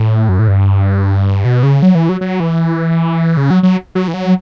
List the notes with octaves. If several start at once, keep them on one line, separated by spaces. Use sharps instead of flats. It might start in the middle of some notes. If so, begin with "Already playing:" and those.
Already playing: A2
F#2
A2
G2
B2
C#3
F#3
E3
F#3
F#3
E3
C#3
F#3
F#3
F#3
E3
F#3